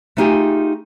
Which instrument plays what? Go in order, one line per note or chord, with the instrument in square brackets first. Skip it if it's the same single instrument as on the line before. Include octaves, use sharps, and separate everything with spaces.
[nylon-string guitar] A3 B3 D#4 F4 G4 G#4